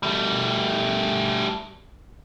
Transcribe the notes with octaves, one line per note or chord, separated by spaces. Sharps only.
G3 A3